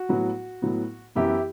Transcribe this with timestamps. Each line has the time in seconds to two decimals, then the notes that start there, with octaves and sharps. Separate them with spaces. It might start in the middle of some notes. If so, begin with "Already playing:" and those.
Already playing: F#4
0.09 A2 F#3 B3
0.62 A2 F#3 B3
1.15 F#2 E3 B3 E4 G4